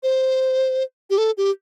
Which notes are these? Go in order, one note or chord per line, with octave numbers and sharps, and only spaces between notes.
C5
G4
A4
G4